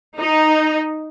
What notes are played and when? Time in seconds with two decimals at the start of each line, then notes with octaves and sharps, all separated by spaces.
0.18 D#4